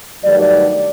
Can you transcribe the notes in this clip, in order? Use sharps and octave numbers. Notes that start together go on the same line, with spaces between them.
G2 D#3 F#3 A3 D5